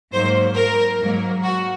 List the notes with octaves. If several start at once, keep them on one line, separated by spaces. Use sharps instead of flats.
G#2 F#3 A#3 C5
A#4
G#2 F#3 A#3
F#4